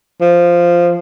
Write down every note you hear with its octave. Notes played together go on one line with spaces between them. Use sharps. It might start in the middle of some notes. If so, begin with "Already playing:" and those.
F3